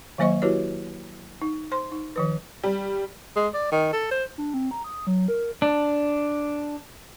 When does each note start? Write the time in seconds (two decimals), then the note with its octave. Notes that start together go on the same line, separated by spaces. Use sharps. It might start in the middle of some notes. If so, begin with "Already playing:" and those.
0.18 D#3 F#3 A#3 C5 D#5 C#6
0.42 E4 F#4 G4 B4 C#5
1.42 D#4
1.72 C5 C6
1.92 D#4
2.16 D#3 F3 B4
2.64 G3
3.36 G#3
3.54 D5
3.72 D#3
3.93 A4
4.11 C5
4.38 D4
4.54 C4
4.71 A#5
4.84 D#6
5.07 F#3
5.28 A#4
5.62 D4